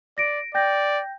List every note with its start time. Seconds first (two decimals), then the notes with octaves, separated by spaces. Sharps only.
0.18 D5 A#6 D7
0.54 D5 G5 G6 A#6